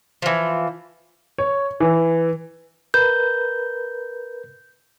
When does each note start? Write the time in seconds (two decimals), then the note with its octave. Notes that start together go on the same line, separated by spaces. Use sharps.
0.22 E3 F3
1.38 C#5
1.80 E3
2.94 A#4 B4 G6